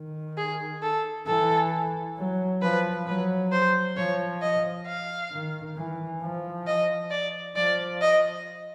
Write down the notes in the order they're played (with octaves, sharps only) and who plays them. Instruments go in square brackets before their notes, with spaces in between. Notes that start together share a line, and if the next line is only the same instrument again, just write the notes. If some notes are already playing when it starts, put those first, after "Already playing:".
Already playing: [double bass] D#3
[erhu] G#4
A4
[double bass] E3 [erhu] A4
[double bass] F#3
[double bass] F3 [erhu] B4
[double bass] F#3 [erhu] B4
[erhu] C5
[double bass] F3 [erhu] C#5
[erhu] D#5
F5
[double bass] D#3
E3
F3
[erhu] D#5
D5
[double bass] F3 [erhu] D5
[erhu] D#5